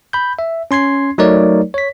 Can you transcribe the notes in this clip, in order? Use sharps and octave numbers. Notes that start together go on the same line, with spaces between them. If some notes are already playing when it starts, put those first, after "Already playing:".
B5 G6
E5
C#4 C6 G#6 C7
F#3 A3 D#4 A#4 C#5 D5
C#5 B6